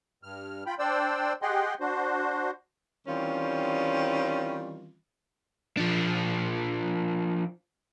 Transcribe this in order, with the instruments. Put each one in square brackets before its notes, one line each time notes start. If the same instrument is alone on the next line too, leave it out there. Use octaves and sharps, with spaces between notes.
[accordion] G2 F6
F4 G5 B5
D4 C5 D5 G5 E6
G4 G#4 D#5 F#5 G5 C6
D4 F#4 C5
[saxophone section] D#3 E3 G3 C4 C#4 F4
[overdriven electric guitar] F3 D4